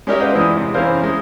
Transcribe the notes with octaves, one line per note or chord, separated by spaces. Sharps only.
G#3 C#4 G4 A#4 C#5 E5
F4 B4 C5 D5 D#5 F#5
E2 G#3 E4 D#6
C3
E2 C#4 E4 A#4 C5 F5
G#3